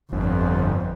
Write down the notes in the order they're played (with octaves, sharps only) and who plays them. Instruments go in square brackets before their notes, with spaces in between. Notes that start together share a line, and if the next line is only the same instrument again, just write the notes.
[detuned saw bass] G1 [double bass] F2